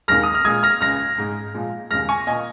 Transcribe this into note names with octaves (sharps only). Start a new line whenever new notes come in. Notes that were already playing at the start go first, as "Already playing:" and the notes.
D#2 D#3 G#3 F6 A#6
D#6
F6
A#2 G#3 D#6 G#6
F6 A#6
C#2 C#3 G#3 F6 A#6
G#2 G#3
A#2 F3 G#3
D#2 C#3 G#3 F6 A#6
G#5 C#6
A#2 A#3 D#5 G#5